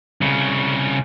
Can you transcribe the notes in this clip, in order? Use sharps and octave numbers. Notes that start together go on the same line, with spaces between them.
C2 C#3